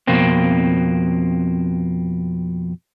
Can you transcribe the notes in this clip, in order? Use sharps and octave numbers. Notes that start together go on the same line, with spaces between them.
F2 B2 A#3 C4